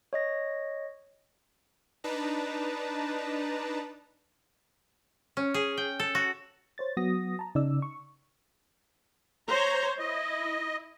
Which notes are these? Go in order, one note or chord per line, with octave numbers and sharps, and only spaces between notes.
C#5 D#5 A#6
D4 D#4 B4 A5 A#5
C#4
G#4
G5
A4
F#4
C5 C#5 A6
F#3 B3 F#4 D#6 A#6
A5 A#5
C#3 D#4 D5 E6
C#6
C5 C#5 A#5
E4 D#5